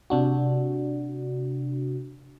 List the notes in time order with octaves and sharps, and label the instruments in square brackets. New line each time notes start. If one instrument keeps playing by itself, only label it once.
[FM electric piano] C3 D4 F#4